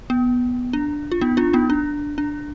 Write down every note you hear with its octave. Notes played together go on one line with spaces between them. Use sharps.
B3
D4
F4
B3 D#4
D4 F4
B3 D#4
D4
D4